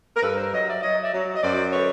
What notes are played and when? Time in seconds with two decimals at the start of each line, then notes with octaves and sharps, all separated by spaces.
0.16 A#4
0.22 G2 A4 B4
0.37 A#4 C5
0.52 F#3 C#5 D#5
0.68 D5 E5
0.82 F#3 C#5 D#5
1.03 D5 E5
1.13 F#3
1.36 D#5
1.42 F#2 C5 D5
1.73 D3 B4 C#5